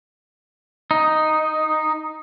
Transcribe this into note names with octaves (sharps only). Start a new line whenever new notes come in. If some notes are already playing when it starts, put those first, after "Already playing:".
D#4